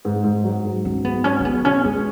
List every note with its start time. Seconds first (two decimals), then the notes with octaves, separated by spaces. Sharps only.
0.05 G#2
0.24 G#2
0.44 F#3
0.65 G#2
0.84 F#3 C#4
1.05 G#2 B3
1.24 F#3 C#4
1.40 C#4
1.45 B3 G#4
1.65 B2 C#4
1.84 G#3 C#4